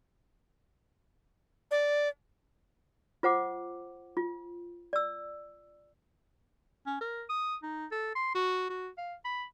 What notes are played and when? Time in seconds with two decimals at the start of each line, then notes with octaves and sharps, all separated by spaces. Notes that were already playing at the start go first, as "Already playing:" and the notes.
1.71 D5
3.23 F4 C5 F#5 D6
4.17 F4
4.93 D5 E6
6.86 C#4
7.01 A#4
7.29 D#6
7.63 D#4
7.91 A4
8.15 C6
8.35 F#4
8.70 F#4
8.98 F5
9.25 B5